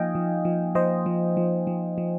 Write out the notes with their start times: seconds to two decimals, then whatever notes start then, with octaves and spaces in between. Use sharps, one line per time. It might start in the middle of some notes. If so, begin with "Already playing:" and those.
Already playing: F3 A#3 D#4 D#5 F5 G5 G#5
0.15 F3
0.45 F3
0.75 F3 C5 D#5
1.06 F3
1.37 F3
1.67 F3
1.98 F3